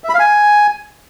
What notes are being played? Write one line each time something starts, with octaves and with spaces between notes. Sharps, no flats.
E5
B5
F5
G#5